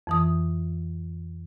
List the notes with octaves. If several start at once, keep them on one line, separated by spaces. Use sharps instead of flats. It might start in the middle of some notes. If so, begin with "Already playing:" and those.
F2 E3 D#6